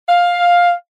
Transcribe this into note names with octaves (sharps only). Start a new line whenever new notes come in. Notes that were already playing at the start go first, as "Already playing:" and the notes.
F5